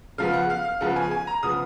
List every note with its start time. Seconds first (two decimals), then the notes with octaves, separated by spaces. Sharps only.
0.18 C#3 F3 B3 F5
0.33 F#5
0.50 F5
0.65 F5
0.81 C#3 F3 B3 F#5
0.96 G#5
1.11 G#5
1.27 A#5
1.43 C#3 F3 B3 D#6